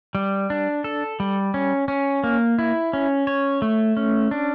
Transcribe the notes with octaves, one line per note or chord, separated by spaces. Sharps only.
G3
D4
A4
G3
C#4
C#4
A#3
E4
C#4
C#5
A3
C#4
D4